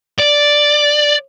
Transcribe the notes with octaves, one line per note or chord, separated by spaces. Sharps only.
D5